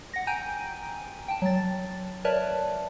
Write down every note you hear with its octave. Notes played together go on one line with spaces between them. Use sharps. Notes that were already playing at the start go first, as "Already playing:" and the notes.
F#5 A#6
G5 G#5 A#5 G6 D7 D#7
G5 A5
F#3 A6
A#4 B4 C#5 D5 E5 A5